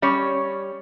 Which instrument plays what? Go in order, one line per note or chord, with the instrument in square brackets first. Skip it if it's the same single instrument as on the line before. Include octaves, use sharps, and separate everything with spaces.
[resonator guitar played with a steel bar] G3 C#4 C#5